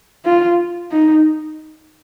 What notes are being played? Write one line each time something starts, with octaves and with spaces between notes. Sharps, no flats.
F4
D#4